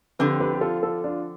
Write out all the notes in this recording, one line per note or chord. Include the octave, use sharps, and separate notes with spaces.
D3 F3 C4 G4 B4
G4 B4
G4
F4 A4
F4 A4
D4 F4